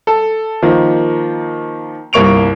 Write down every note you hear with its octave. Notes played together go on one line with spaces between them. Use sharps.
A4
D#3 F3 A#3
G1 C2 A#3 C#6 D7 F7